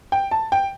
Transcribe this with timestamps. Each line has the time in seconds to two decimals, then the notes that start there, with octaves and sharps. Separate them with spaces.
0.12 G5
0.31 A5
0.52 G5